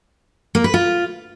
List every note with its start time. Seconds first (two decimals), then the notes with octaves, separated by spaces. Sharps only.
0.55 A#3
0.64 B4
0.74 F4